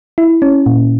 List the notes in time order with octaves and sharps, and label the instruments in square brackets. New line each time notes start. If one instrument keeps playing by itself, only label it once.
[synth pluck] E4
C#4
A#2